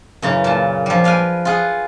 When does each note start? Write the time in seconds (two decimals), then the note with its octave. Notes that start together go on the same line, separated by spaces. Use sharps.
0.22 F#2 C#3 E3
0.44 A#2 A5
0.86 F3 G3
1.04 B4 F5 G5 G#5
1.45 F4 G#4 F#5